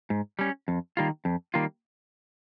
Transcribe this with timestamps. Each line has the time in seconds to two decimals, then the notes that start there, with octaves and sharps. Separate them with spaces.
0.10 G#2
0.39 G3 C#4
0.68 F2
0.97 D#3 G3 A#3 F4
1.25 F2
1.54 D#3 G3 A#3 F4